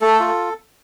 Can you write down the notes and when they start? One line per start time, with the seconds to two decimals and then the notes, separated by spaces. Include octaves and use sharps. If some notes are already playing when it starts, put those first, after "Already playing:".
0.01 A3 A4
0.20 F4